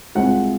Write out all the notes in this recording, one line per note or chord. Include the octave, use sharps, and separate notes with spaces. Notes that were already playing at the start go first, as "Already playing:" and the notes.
C2 C3 F3 G#3 F#5